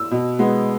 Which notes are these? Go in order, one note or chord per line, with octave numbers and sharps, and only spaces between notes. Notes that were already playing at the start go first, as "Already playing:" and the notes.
Already playing: E6
B2
G#3 B3